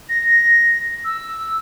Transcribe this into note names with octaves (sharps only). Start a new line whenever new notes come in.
A#6
E6